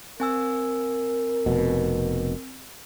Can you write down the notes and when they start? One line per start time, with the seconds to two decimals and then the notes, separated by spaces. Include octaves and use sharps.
0.20 C4 A#4 G#5 E6
1.46 F1 B2